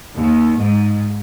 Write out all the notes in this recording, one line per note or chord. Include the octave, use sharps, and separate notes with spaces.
D#2
G#2